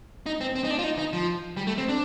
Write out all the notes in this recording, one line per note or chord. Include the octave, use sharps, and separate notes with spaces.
D#4
C4
C4
D#4
D4
F4
D#4
D#4
F3
G3
A3
C4
D4